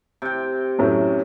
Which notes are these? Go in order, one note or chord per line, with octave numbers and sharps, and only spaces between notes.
C3 G5
F#2 A2 F#3